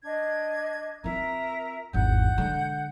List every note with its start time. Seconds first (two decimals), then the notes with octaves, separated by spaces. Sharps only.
0.03 D4 D#5 G#6
1.04 C4 F4 A#4 E5 A#5
1.93 G#1 E2 F#5 G6
2.38 D3 G#3